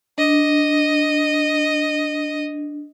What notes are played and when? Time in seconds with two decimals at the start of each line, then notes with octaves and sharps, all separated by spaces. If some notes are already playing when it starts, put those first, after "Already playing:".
0.18 D4 D#5